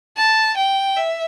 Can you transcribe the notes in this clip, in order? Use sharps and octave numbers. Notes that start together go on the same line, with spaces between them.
A5
G5
E5